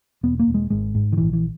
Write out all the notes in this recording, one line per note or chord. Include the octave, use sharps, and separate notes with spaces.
E1 B3
A#3
E1
G#3
G#1 G#3
G#2
D#3
A#1 E3
E3